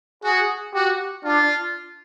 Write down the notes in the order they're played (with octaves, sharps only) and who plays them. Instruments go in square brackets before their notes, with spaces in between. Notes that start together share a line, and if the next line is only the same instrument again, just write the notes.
[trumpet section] F#4 [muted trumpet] G#4
[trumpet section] F#4 [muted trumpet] G4
[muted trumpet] D4 [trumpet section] F4